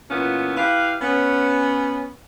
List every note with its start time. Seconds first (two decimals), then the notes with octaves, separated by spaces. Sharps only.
0.10 A#2 E3 B3 C#4 F4
0.56 E4 G4 B4 F5
1.01 B3 C#4